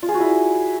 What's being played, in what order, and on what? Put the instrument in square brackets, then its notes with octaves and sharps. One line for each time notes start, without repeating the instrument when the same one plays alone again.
[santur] F4
G#4
F#4
E4